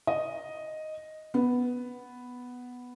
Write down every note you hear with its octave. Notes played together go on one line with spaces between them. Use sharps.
D#5
B3